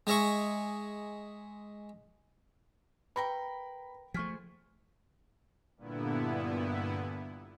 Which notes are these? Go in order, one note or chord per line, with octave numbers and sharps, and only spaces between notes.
G#3 G#4 D#5 E5 C#6
A#4 B4 G5 A#5 B5 C#6 A#6
F3 A3 G#4 C5 C#6 F6 B6
G2 A#2 D3 B3 E4